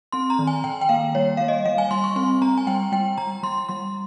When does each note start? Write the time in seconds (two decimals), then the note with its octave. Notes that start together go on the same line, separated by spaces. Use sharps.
0.12 C4 C6
0.30 A#5
0.39 D#3
0.47 G#5
0.64 D#3 G5
0.81 G5
0.89 A#3 F5
1.15 G3 C#5
1.37 G3 F5
1.48 D#5
1.65 G3 F5
1.78 G#5
1.91 G3 C6
2.04 C#6
2.16 C4 C6
2.42 C4 A#5
2.58 G#5
2.67 G3 G5
2.92 G3 G5
3.18 G3 A#5
3.43 G3 C6
3.69 G3 C6